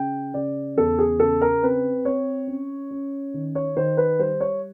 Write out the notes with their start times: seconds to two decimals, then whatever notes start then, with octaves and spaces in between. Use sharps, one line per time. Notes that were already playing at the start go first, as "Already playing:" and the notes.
Already playing: C#3 G5
0.34 C#3 D5
0.77 E2 A4
0.99 G#4
1.20 C#3 A4
1.41 A#4
1.63 C4 B4
2.05 C4 C#5
2.47 C#4
2.91 C#4
3.34 D#3
3.55 C#5
3.77 D#3 C5
3.97 B4
4.19 G3 C5
4.40 C#5